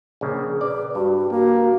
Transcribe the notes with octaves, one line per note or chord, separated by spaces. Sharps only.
A#1 C#3
B4 D5
G2 F#4
A#3 F#4